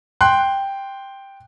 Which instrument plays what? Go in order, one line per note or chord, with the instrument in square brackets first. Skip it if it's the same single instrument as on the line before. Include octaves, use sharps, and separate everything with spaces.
[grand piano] G5 C6 F#6